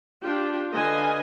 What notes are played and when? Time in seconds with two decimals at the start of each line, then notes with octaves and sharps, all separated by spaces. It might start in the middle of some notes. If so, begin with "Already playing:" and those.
0.22 D4 F4 G4
0.72 D3 B4 D#5 F5 G#5